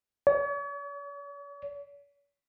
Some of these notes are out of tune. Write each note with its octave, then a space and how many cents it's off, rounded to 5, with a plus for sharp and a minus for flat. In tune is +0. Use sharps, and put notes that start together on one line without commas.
C#5 +45